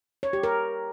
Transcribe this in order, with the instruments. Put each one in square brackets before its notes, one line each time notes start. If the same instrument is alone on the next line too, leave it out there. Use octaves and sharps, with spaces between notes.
[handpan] C#5
G4
A#4